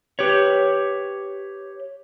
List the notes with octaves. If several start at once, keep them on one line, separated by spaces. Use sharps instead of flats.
G4 B4 C#5